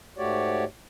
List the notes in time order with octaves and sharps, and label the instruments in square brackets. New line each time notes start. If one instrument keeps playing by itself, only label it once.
[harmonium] G#2 A3 F#4 G4 C#5 D5